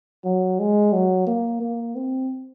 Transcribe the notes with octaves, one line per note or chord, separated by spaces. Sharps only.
F#3
G#3
F#3
A#3
A#3
C4